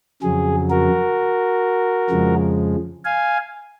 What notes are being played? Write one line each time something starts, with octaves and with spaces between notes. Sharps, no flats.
F2 C#3 F#3 G#4
F#4 A#4
F2 C#3 F3 G#3
F5 G#5